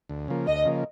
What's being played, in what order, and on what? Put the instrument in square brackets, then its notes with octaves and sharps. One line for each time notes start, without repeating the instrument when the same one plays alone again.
[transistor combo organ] D2
C#3 F3 A#3
[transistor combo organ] D2 [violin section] D#5
[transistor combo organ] C#3 F3 A#3